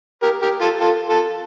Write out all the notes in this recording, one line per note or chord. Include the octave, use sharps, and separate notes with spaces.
G4 A#4
G4 A#4
F4 A4
F4 A4
F4 A4